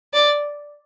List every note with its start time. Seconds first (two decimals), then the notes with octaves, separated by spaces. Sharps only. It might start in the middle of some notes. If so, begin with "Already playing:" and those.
0.14 D5